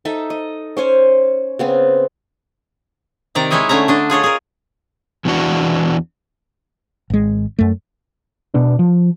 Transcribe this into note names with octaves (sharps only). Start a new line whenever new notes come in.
D#4 A4 E5
D#5
C#4 C5 C#5 G#5
C#3 B3 C4
C3 D#3 D5 A#5
G#3 D#4 E4 C#5 D#5 E5
D3 A3 C#4 E5 A#5
D3 D4 D#5
F4 G#4 C#5 D#5
G#4 A#4
E2 B2 E3 D4 F#4 F#5
G#1 G#3
F#2 A3
B2 B3 D4
F3